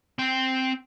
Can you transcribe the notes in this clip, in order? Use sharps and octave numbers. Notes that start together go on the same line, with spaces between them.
C4 G5